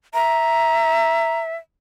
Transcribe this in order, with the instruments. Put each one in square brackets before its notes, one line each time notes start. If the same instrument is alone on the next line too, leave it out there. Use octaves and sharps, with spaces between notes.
[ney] E5 [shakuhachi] A#5